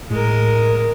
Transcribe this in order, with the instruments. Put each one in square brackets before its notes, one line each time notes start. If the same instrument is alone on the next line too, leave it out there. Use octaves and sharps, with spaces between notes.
[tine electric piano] A2 [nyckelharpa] G#3 A#4